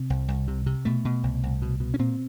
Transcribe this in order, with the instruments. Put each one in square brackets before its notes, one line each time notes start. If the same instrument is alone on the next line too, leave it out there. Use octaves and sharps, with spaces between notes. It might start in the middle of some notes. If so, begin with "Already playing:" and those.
Already playing: [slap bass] C3
C2
C2
C3
C3
B2 A3
B2
C2
C2
B2
B2
C#4
A#2 C4